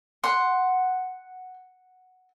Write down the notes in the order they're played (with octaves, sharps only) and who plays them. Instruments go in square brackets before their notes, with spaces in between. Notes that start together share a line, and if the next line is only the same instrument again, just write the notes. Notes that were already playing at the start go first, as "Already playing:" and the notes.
[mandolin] F#5 [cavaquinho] C6